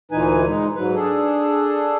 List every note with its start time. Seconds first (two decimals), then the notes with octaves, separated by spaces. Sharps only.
0.12 D2 A#2 E3 D#4 B4 G#5
0.47 G#3 D#4
0.76 G#2 F#3 B4
0.95 D4 G#4 A4